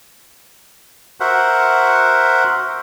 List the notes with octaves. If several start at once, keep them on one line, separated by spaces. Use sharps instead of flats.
F#4 A#4 C5 E5 F#5